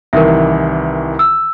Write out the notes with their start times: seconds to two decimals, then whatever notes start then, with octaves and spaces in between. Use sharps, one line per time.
0.13 C2 D#3 E3 A#4 E5
1.19 E6